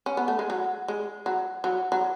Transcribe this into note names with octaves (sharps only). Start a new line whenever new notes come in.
C#4
B3
A3
G#3
F#3
G#3
F#3
F#3
F#3